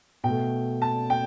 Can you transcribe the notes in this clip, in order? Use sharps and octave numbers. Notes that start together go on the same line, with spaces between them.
B2 A3 G5
A5
G5